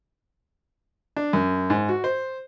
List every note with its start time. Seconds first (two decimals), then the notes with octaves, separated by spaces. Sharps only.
1.16 D4
1.33 F#2
1.70 G#2
1.89 F#4
2.04 C5